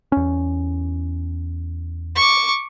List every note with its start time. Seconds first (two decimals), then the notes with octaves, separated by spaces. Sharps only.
0.12 E2 C#4
2.16 C#6 D6